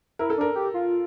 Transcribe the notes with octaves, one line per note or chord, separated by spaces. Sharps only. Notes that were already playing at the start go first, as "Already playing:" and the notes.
E4 A#4
A4
D4 A#4
G4
F4